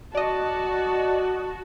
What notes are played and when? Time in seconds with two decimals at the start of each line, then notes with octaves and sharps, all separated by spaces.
0.15 F#4 D5 D#5 A5